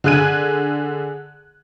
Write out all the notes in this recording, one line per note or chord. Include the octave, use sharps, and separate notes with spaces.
D3 G#4 G#5 F#6 G#6 D#7